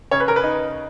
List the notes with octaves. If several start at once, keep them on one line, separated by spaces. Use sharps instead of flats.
C#3 C#5
B4
A#4
B4
D#4